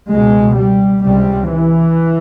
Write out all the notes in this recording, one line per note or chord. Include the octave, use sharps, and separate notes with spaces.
C#2 B2 G#3
G3
C#2 C3 G3
E3